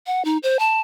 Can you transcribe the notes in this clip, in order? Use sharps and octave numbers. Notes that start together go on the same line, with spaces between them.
F#5
D#4
C5
A5